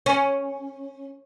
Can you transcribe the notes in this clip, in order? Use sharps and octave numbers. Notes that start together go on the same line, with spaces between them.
C#4